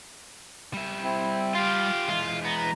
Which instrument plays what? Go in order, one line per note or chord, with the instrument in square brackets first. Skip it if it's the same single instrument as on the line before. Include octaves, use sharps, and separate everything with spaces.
[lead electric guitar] G3 E5
[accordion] C4 E4
[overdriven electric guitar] F4 G4 [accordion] F5 C6
[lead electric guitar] E3 G#3 [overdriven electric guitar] F4
[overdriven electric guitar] B3 [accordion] A#5